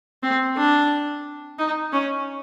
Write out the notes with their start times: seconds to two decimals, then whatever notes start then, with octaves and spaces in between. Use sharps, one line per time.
0.23 C4
0.57 D4
1.59 D#4
1.92 C#4